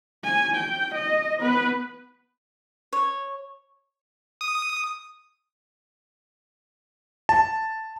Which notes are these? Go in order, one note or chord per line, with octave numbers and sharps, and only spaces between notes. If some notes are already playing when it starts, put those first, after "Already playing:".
G#5
G5
D#5
B3 B4
C#5
D#6
A5